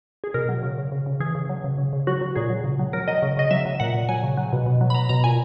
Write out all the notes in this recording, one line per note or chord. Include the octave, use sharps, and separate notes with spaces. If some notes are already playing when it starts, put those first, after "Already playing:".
G#4
B2 A#4
F#3
C#3
C#3
C#3
C#3
E3 G#4
C#3
F#3
C#3
C#3
C#3
F#3 F#4
F#3
A#2 G#4
F#3
C#3
F#3
F#3 A#4
F#3 D#5
C#3
C#3 D#5
F#3 E5
F#3
A#2 F#5
A#2
F#3 G#5
C#3
F#3
B2
B2
F#3
B5
F#3 A#5
B2 A#5
A#2 G#5